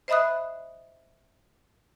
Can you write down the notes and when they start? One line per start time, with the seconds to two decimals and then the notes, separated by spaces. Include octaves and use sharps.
0.08 C5 D#5 E5 B5 D#6 F#6